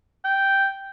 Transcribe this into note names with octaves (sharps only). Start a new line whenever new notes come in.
G5